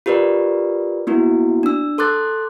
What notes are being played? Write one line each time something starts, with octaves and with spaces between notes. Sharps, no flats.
F4 G4 A#4 B4 D5
A#3 B3 E4 F#4
D4 E6
A4 C6 D6 F#6 A6